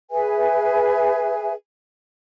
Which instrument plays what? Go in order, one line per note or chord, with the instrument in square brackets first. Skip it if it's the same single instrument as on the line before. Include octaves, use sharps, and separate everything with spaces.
[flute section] G#4 B4 E5 G#5